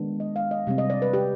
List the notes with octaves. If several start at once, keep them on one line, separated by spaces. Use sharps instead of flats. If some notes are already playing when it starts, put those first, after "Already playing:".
Already playing: D#3 G#3 B3 D4
D#5
F5
D#5
C3 G3 C4
D#5
D5
B4
G4